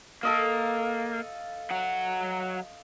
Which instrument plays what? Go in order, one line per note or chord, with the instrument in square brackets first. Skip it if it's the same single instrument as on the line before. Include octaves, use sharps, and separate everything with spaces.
[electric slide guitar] A#3 [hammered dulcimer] A4 D#5 F5
[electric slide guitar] F#3 F#5